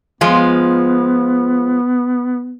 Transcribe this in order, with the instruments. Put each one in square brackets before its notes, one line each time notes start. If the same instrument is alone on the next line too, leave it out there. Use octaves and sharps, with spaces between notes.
[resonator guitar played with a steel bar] F3 G#3 F4 [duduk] B3